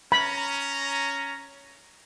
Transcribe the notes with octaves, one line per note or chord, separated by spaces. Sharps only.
C#4 A#5 B5